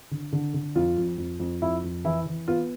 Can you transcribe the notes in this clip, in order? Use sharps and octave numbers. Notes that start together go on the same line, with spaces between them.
D3
D3
D3
F2 F4
F2
F2
F2
F2 E4
F2
E3 E4
E3
B3 F4